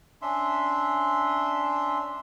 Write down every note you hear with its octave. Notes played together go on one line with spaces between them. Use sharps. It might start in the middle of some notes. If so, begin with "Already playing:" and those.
C#4 D4 E5 C6